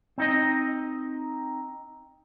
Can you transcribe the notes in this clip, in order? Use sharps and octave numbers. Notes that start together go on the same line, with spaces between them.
C4 D#4 D#5